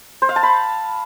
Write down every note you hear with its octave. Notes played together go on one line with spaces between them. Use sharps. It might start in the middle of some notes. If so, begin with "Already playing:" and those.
C5
F5
A5
B5